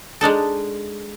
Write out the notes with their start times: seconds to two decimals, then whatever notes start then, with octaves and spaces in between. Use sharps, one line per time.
0.21 G#3 D4 D#4 A4